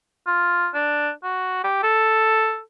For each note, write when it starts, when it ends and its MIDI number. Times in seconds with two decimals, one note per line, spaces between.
0.27 0.68 65
0.74 1.10 62
1.23 1.59 66
1.64 1.81 67
1.83 2.59 69